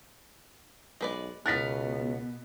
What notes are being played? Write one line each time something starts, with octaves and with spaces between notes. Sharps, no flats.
B1 G#3 B4 D5
C#2 B2 B3 A#4 F#6 A6 B6